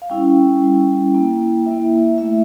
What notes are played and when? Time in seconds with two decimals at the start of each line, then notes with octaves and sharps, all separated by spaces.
0.02 F5
0.10 G3 C#4 E4 G5
0.62 G3 C#4 E4
1.14 A#3 E4
1.66 A#3 E4 E5
2.18 A3 E4 E5